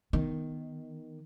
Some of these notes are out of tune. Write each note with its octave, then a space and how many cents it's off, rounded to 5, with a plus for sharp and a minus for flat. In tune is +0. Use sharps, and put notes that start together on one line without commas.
D#3 +0 B3 +0